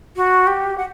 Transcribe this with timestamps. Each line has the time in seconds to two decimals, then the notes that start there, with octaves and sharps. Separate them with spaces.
0.16 F#4
0.47 G4
0.78 F#5